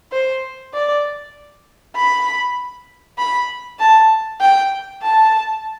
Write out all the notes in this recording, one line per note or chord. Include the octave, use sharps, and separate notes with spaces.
C5
D5
B5
B5
A5
G5
A5